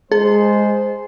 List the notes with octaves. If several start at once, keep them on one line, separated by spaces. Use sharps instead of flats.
G#3 G#4 C5